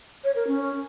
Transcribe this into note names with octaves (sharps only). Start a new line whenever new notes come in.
C#5
A#4
C#4